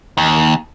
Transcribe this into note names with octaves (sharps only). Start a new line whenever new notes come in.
D#2